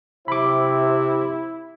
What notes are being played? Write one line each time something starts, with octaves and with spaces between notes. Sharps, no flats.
C3 E4 C5 B5 D6